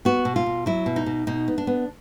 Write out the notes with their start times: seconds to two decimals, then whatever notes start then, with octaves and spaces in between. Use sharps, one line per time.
0.05 B3 F#4
0.25 B2
0.36 F4
0.46 B2
0.66 F#3 E4
0.86 B2
0.96 D#4
1.06 B2
1.27 B2 D#4
1.48 B3
1.58 D4
1.67 B3